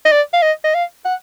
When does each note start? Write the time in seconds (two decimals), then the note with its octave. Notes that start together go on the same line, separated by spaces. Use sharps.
0.05 D#5
0.12 D5
0.33 F5
0.42 D#5
0.64 D#5
0.74 F5
1.05 F#5